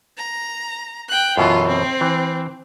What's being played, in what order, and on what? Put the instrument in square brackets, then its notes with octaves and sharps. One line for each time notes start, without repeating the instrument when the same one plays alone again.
[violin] A#5
G5 F#6
[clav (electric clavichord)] F#2 B2 E3 [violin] F4 A4
[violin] C4
[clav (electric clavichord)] E3